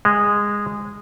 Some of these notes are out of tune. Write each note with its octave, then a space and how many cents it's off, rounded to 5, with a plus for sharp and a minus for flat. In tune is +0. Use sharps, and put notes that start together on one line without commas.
G#3 -15